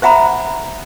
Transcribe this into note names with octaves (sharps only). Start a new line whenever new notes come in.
C5 E5 F#5 A#5 B5